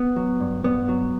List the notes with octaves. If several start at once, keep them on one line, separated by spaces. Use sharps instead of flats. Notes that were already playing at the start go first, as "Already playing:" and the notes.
Already playing: B3
F#3
G2
G2 B3
F#3